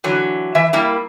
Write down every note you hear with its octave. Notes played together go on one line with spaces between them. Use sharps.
D3 E3 F#3
E3 E5
G3 A#3 E4